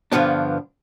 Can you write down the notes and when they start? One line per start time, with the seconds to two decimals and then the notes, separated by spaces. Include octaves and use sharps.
0.12 G2 D3 F3 B3 D4